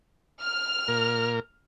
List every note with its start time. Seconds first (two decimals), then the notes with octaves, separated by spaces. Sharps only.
0.41 F6
0.88 A#2 A#4